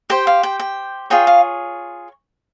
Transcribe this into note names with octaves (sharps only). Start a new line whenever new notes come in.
G4 C5 G5
F5
G5
G5
F4 G#4 C#5 G5
F5